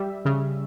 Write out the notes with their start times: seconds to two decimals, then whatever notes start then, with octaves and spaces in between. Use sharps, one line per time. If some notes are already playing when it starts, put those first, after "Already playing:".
Already playing: G3 E5
0.25 C#3